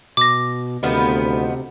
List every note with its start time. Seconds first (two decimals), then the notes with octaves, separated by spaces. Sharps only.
0.17 B2 D6 A#6
0.83 D2 C3 D#3 F3 B3